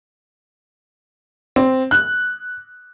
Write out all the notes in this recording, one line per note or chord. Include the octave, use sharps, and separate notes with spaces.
C4
F#6